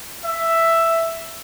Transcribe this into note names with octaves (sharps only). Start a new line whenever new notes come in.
E5